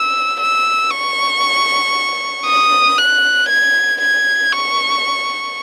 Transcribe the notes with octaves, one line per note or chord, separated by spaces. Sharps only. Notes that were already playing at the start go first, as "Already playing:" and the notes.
Already playing: E6
E6
C#6
D#6
F#6
G#6
G#6
C#6